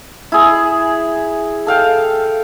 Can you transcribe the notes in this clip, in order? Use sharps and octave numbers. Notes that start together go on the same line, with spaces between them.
E4 G#4
A4 F5 G5